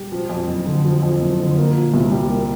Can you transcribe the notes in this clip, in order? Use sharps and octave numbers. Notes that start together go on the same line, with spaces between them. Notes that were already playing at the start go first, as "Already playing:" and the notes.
Already playing: G3
F3
F2
F#1
D3
F3
F2
F#1
D3
A#3
A#2
C2
G3
A#3